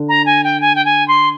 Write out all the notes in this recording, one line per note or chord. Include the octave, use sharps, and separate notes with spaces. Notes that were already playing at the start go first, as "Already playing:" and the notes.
Already playing: D3
A#5
G#5
G5
G#5
G5
G#5
C6